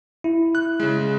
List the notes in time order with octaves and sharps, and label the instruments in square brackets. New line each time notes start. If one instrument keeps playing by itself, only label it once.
[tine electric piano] E4
[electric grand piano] F#6
C#3 G#3